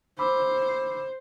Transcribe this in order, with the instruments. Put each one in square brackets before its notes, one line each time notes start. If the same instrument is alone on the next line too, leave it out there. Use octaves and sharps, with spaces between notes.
[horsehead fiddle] C5 [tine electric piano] B5 D6 E6